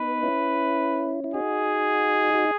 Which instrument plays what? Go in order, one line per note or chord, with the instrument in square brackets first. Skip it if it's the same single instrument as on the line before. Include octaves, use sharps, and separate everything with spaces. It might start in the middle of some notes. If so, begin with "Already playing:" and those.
Already playing: [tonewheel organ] B3 D#4 [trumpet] B4
[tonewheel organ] C#4 E4
E4
[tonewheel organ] D#4 F#4 [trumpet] G#4
[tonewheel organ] F#4